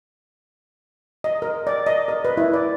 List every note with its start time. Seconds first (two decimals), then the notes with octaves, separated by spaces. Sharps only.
1.24 D#5
1.42 A#4
1.67 D5
1.87 D#5
2.08 A#4
2.25 B4
2.37 E4
2.54 D5